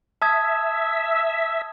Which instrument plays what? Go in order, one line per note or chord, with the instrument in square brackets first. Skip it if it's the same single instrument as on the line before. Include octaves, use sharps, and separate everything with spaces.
[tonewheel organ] E5 [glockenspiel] A5 D#6 G#6